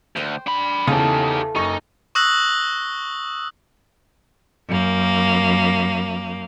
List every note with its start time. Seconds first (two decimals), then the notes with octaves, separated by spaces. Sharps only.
0.16 D2 C5 G5
0.47 D4 B5
0.87 E2 C#3 A3 D#4 G4
1.55 F#1 D#4 C#6
2.15 C#6 D#6 E6 F#6 A#6 F#7
4.68 F#2 A#3